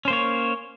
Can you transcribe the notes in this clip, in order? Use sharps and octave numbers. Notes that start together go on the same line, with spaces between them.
A#3 C#4 C5 C#5